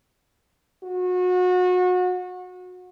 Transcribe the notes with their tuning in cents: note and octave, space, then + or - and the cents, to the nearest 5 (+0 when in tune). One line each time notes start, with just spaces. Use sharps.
F#4 -30